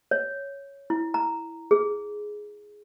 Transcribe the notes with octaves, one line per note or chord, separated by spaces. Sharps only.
C#5
E4
A#5
G#4